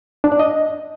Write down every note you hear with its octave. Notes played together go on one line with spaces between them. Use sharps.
D4
D5
D#5